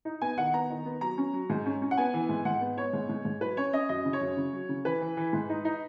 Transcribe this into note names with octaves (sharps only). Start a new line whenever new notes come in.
D#4
B3 G#5
D#3 F#5
B3 A#5
D#3
B3
F#3 A#5
C#4
F#3
G#2
C#4
C#4
F#5
B3 G#5
E3
G#2
G#2 F#5
B3
B3 C#5
G#2
G#2
G#2
F#3 B4
C#4 C#5
C#4 D#5
F#2 D#5
C#3
C#5
F#2
C#3
F#3
C#3
E3 B4
E3
E3
G#2
D#4
D#4